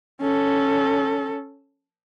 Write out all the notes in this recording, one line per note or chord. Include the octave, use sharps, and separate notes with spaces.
C#4 A4